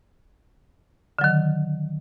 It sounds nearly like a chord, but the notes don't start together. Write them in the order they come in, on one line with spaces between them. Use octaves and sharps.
D3 F#3 D#3